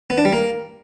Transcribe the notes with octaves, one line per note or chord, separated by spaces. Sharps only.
B3
D4
G3
A#3